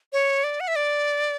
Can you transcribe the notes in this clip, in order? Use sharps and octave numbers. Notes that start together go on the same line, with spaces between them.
C#5
D5
F#5
E5
D5